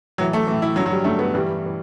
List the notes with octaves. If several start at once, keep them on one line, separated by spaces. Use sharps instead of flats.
A2 E3 F#3
A3
A2 E3
E4
G2 D3 F#3
F#3
G3
G2 D3 A3
B3
G2 E3 G3
E3